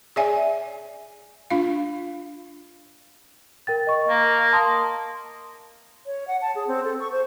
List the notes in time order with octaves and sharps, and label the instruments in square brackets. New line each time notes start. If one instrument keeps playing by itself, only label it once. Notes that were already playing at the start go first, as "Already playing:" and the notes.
[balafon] G#4 C#5 D5 E5 G#5
D4 F4 F5
[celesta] A#4 G5 A6
D#5 C#6
[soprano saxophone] A#3
[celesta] A5 C6 D#6
[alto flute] C#5
F#5
A5
G#4
C4
A4
C#6
C5